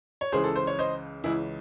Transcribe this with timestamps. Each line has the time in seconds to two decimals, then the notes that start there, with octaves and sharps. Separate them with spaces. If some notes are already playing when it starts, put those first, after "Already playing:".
0.21 C#5
0.32 C#2 C#3 E3 G#4 C5
0.44 A4
0.56 C5
0.67 C#5
0.79 C5 D#5
1.24 C#2 C#3 E3 E4 G#4